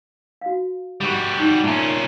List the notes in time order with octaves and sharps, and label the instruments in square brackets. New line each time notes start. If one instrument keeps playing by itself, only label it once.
[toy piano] F#4 F5
[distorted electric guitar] G3 F#4 [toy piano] G4 A#4
[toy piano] D#4
[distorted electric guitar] A#2 C#4 [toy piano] E5 A5